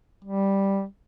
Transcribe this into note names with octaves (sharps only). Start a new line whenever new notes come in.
G3